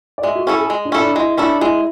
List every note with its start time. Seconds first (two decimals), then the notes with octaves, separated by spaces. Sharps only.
0.18 D5
0.24 G#3 E5
0.35 F#4
0.47 C#4 E4 G#4 A4
0.58 G#4
0.70 G#3
0.85 D4
0.92 C#4 E4 A4
1.00 D4
1.16 G#3 E4
1.37 C#4 D4 E4 A4
1.61 G#3 E4